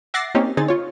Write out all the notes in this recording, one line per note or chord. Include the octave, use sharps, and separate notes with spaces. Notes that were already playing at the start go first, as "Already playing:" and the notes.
E5 F#5 D6 A6 A#6 C7
A#3 C4 C#4 D#4 G4
D3 C4 D#4 G#4 A6
F4 C#5